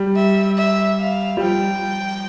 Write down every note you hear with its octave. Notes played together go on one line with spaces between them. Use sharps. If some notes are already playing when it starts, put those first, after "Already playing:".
Already playing: G3
E5
E5
F5
G3
F3 G5